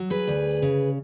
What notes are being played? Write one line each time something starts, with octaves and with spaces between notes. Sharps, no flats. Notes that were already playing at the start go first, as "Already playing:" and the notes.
Already playing: F#3
G#4 B4
D2
C#3